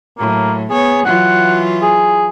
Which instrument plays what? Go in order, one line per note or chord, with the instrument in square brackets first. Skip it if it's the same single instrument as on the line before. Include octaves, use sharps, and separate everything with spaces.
[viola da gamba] A2 F#3 [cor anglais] A#3
[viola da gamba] B3 C#5 [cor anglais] G#4
[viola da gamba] E3 F#3 F4 [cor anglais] F#5
[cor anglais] G#4